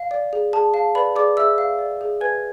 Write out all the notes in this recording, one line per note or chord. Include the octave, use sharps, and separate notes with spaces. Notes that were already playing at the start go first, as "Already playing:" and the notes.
Already playing: F5
D5
G#4
G#4 A5
F5 A5
B4 D5 B5
G#4 D5 D6
G#4 E5 E6
F5
D5
G#4
B4 G#5 G#6